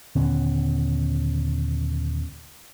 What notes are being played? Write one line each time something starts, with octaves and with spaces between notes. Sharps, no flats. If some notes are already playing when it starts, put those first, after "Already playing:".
D#1 D3 B3 C#4